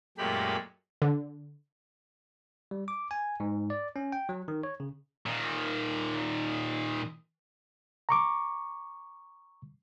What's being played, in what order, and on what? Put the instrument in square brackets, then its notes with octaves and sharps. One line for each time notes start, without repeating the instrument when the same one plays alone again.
[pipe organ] F#2 A#2 G#3 A3 G4 B5
[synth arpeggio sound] D3
[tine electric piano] G3
D6
G#5
G#2
D5
C#4
G5
F#3
D#3
C#5
C#3
[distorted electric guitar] A#2 D#3
[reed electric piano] A#5 C#6 D6